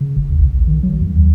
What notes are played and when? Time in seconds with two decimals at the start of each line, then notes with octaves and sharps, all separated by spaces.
0.01 C#3
0.17 G1
0.30 D2
0.41 C2
0.53 A#1
0.67 D#3
0.83 F#3
1.01 F2
1.12 D#2